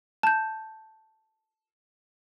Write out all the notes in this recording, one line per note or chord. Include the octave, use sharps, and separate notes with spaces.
A5 G6